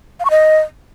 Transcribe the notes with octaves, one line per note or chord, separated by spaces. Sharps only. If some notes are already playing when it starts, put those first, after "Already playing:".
F5
C#6
D#5